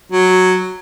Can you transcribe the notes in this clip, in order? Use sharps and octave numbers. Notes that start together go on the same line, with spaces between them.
F#3